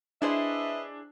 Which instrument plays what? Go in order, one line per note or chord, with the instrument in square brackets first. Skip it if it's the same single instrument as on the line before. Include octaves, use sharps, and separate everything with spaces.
[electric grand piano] D4 [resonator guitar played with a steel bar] E4 G#4 C5 [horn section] B4 D#5 E5